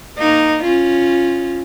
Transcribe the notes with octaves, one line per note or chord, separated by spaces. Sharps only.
A#3 D#4
C#4 F4